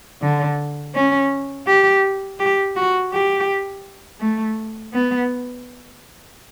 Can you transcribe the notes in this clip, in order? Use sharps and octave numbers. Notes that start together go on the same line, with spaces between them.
D3
C#4
G4
G4
F#4
G4
A3
B3